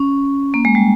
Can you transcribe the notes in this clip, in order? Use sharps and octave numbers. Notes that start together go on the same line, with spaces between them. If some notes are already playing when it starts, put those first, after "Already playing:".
Already playing: C#4
A#3
G#3
G3